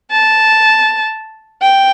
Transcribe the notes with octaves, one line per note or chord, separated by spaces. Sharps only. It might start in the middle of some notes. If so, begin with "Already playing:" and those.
A5
G5